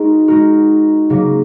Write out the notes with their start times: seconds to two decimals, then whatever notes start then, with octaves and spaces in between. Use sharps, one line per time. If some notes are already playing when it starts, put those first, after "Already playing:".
Already playing: G#3 D#4 F#4 A#4
0.28 G#3 D#4 F#4 A#4
1.10 C#3 F#3 A#3